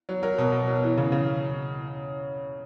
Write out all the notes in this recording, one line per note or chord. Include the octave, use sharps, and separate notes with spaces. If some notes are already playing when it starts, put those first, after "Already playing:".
F#3
F#3 A#4
B2
B2
F#3
E3
C#3
C#3